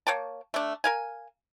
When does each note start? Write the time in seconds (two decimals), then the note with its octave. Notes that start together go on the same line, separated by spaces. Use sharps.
0.07 A#3 C#5 G5 A5
0.54 A3 D4
0.84 A#4 F5 G#5